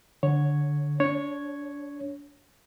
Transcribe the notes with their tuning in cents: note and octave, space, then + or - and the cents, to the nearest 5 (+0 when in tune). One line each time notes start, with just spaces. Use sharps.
D3 +0 C#5 +0
D4 -30 C#5 +0